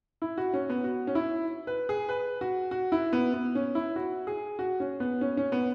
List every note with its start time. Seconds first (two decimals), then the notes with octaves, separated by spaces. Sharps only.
0.22 E4
0.38 F#4
0.54 C#4
0.70 B3
0.84 F#4
1.07 C#4
1.15 E4
1.67 B4
1.89 G#4
2.09 B4
2.41 F#4
2.71 F#4
2.92 E4
3.13 B3
3.34 B3
3.55 C#4
3.75 E4
3.96 F#4
4.27 G#4
4.59 F#4
4.80 C#4
5.00 B3
5.21 C#4
5.37 C#4
5.52 B3